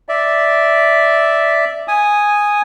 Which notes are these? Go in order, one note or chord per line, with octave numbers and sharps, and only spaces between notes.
D5 E5
G#5 D#6